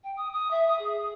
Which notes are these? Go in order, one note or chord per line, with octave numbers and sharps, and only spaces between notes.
G5
D#6
D#6
E5
D#6
G#4
G#4